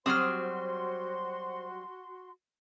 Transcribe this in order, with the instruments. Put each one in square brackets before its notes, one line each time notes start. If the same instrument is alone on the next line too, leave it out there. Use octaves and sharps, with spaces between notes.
[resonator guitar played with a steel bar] F#3 G3 C4 [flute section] F#4 C6 [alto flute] C5 [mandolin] D#6 F6